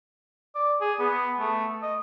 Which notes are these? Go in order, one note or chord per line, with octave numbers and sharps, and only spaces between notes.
D5
G#4
B3
A3
D#5